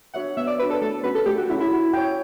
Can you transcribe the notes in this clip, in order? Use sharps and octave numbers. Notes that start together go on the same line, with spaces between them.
D4 F#4 C#5 E5 F#5
B3 E5
D5
D4 F#4 B4 C#5 E5
A4
A3 A4
C#4 F#4 B4
A4
A3 G4
F#4
C#4 E4 F#4
E4
F#4
C#5 G5